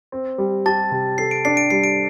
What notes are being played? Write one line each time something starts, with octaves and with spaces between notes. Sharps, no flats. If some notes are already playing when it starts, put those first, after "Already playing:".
C4
G3
G4 A5 A6
C3
A4 C7
D7
D4 C7
D7
G3 C7
D7